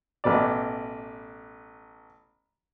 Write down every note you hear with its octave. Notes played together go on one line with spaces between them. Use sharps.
A1 B2 D5